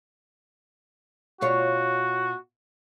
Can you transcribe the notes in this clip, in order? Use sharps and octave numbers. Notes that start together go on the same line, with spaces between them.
B2 F4 F#4 C#5